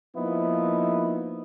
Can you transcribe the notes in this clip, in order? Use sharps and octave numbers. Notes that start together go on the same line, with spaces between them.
F3 A#3 B3 D#4 E4